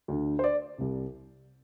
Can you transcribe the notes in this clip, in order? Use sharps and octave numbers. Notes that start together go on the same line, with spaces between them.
D2 D3
C5
D5
C2 C3